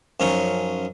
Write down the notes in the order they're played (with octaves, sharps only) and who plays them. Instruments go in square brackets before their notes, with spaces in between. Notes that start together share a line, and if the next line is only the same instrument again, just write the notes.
[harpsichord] F#2 F3 C#4 D#4 C#6